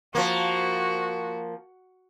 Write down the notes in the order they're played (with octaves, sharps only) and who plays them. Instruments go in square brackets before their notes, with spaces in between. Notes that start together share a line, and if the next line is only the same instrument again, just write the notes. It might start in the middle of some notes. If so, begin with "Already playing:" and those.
[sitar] F3 A#3 [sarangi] F#4